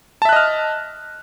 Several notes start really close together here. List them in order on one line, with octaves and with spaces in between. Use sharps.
A5 E5 F#6 D#5 F6